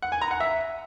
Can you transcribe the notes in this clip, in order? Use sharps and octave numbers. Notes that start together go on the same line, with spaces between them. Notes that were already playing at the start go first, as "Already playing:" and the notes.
F#5
G#5
A#5
F#5
E5